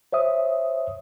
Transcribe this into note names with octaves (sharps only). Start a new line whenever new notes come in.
C5 C#5 E5 D#6